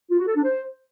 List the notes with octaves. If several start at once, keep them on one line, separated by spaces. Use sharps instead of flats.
F4
F#4
A4
D4
C5